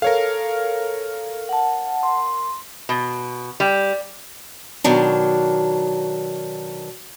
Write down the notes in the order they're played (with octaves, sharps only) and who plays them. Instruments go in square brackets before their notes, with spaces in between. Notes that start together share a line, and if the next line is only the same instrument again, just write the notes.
[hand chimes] A4 [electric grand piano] A#4 C#5 F5
[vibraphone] F#5 A5
[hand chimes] C6
[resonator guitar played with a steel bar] B2
G3
[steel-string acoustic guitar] B2 D#3 F#3 D4